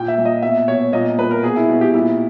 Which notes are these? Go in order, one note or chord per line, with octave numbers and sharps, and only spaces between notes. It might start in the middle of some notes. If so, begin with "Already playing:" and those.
Already playing: A#2 G5
E5
A#2
D#5
B2 E5
B2 C#5
A#2 D#5
A#2 B4
A#4
B2 G#4
E4
B2
G4
A#2 E4